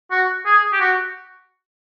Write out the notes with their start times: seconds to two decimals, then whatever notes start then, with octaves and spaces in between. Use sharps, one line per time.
0.11 F#4
0.46 G#4
0.73 G4
0.80 F#4